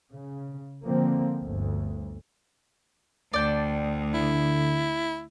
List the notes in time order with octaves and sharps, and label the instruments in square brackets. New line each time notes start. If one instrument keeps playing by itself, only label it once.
[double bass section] C#3
D3 F3 A#3 C4
G1 D2
[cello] D2 [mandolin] D5 G5 A5
[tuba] D3 [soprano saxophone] E4